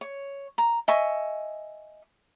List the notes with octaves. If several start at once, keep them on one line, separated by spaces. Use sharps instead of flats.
C#5
A#5
D#5 E5 G#5 C#6